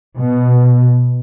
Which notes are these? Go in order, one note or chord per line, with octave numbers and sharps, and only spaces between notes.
B2